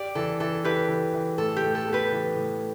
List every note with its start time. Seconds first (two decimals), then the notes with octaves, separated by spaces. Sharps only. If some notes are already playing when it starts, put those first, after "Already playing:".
Already playing: G4 D5
0.15 E3 A4
0.40 E3 A4
0.64 E3 G4 B4
0.89 E3
1.14 E3
1.38 A2 A4
1.56 G4
1.62 A2
1.75 A4
1.87 B3
1.93 G4 B4
2.12 E3
2.36 A2